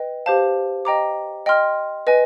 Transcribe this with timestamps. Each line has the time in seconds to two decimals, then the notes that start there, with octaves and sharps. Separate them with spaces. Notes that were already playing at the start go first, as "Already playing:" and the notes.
Already playing: B4 D#5 G5
0.26 G4 C5 F5 A5
0.85 D#5 G5 A#5 D6
1.46 D#5 G5 C6 F6
2.07 B4 D#5 G#5